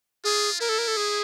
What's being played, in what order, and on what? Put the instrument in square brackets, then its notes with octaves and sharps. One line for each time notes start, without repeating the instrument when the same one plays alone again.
[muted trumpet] F4 [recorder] G#4
[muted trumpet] E4 [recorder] A#4
[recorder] A4
A#4
A4
G#4